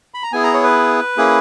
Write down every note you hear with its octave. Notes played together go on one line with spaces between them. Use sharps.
B5
A#5
B3 E4 G#4 G#5
A#5
C#5
B4
A#3 C#4 E4 G#4